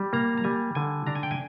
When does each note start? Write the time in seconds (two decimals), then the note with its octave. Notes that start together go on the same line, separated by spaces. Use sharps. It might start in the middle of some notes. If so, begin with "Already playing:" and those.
Already playing: G3
0.13 A#3 A#5
0.38 A#5
0.44 G3 G#5
0.75 D3 G#5
1.07 D4 A#5
1.15 G#5
1.23 G5
1.31 G#5